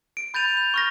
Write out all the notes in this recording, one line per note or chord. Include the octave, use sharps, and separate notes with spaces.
D7
B5 G6 A6 D#7 F7
F7
C#6 F6 A#6